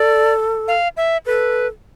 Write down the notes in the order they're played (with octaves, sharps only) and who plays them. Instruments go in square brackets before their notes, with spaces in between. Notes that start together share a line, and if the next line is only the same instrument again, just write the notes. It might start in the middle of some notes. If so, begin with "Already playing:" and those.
Already playing: [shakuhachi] A4 [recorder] D5
[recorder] F5
E5
[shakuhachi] A4 [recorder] B4